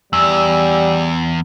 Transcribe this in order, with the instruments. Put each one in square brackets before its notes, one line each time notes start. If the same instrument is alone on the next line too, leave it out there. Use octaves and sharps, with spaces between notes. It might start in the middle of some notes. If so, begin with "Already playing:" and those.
[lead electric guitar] E2 [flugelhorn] G3 [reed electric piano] E6